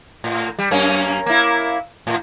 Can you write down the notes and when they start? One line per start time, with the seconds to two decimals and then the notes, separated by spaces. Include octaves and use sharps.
0.24 A2
0.59 G3
0.71 F#2 A#3 C#4
1.26 A#3 E4
2.07 A2